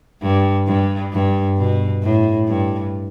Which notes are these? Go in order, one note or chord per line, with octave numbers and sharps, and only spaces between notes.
G2
G2
G2
B2
A2
G2